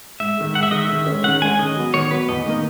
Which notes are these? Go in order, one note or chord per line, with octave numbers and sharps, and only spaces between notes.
G#2 E5
D#3 G#3
G#2 F#5
E5
D#3 G#3 D#5
E5
D#3
G#3 C#4
D#3 F#5
G#3 C#4 G#5
D#3 D#5
F#3 B3
D#3 C#5
F#3 B3 B4
E2 D#5
D#3 A#3 D#4